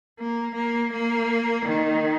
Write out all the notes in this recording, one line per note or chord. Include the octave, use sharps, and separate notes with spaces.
A#3
A#3
A#3
D#3